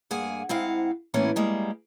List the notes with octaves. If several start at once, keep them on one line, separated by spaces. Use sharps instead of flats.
G2 A#3 G#4 F#5 G#5
G#2 C4 E4 F5 F#5
A2 E3 A#3 B3 C#4
G3 G#3 A#3